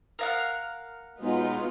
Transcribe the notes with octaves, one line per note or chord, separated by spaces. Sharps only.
A#4 F5 F#5
B2 F#3 G#3 B3 D#4 F4